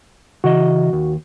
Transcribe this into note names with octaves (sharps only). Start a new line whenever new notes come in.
C#3 E3 F#4 D#5
D#2